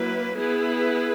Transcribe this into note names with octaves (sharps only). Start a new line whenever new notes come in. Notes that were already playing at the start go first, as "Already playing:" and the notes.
Already playing: F#3 A#3 E4 B4
B3 E4 G#4 B4